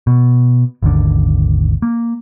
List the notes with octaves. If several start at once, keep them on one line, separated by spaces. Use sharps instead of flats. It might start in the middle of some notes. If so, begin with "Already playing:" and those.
B2
G#1 D#2 D3
A#3